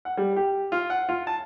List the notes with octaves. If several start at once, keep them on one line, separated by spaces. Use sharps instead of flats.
F#5
G3
G4
F4
F#5
F4
A5